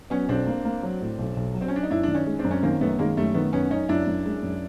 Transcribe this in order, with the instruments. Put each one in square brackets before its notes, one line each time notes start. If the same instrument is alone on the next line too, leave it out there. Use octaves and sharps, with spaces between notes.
[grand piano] F#3 [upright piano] B3 C#4
[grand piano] B1 [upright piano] C4 D4
[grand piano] A#3
A#3
F#3
A2
B1
B1
F#3
[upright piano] C4
C#4
[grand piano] F#3 [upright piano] D4
[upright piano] D#4
[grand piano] F#2 [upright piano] D4 E4
[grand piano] D#3 [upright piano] D4
[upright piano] C#4 D#4
[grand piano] G#3
[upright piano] C4 D4
[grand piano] F#2
[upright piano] C#4
[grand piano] D#3 [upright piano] A#3 C4
[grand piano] F#2 [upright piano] A3 B3
[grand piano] D#3 [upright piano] G#3 A#3
[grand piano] F#2 [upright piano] G3 A3
[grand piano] D#3 [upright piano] A3 B3
[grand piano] F#2 [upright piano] B3 C#4
[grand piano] F#2 [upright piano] C#4 D#4
[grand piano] F#2 [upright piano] D4 E4
[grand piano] F#2
G#3
F#2